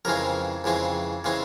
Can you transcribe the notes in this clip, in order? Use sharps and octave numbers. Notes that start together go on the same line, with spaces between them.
F2 C#3 E3 G#3 C4 A#4
F2 C#3 E3 G#3 C4
C#3 E3 G#3 C4